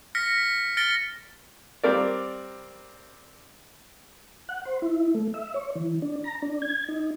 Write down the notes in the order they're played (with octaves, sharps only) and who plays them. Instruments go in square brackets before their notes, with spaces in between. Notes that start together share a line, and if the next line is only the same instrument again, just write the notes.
[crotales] F6 A#6 B6 C#7
B6
F6 A6 A#6 C#7 D7 G7
[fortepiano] G3 C4 A#4 D5
[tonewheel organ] F#5
C5
E4
A3
E5
C#5
E3
D4
A#5
D4
G#6
D#4